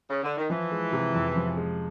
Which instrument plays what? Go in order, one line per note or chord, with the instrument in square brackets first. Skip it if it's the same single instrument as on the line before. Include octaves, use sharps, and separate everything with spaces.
[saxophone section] C#3
D3
D#3
[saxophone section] E3 [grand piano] F3
[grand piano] G#3
C3
F2
F3
G#3